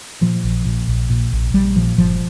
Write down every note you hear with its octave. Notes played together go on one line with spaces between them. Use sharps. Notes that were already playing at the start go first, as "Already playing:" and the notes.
A#2 F3
A#1
A#2
A#1
A#2
A#1
A#1 G3
A#2 F3
G1 F3